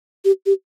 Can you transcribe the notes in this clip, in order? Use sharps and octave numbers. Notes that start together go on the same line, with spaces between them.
G4
G4